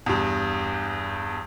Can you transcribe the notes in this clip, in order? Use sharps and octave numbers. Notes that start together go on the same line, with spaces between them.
E2 G2